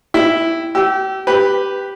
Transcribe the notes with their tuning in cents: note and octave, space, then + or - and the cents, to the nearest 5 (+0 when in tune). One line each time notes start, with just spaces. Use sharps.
E4 +0 G5 +0
G4 -35 E6 +0
G4 +0 B4 +0